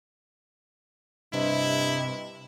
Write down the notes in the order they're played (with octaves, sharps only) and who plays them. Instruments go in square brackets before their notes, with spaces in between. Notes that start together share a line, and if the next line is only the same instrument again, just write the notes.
[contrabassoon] G2 [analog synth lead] C3 [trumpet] E4 [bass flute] D#5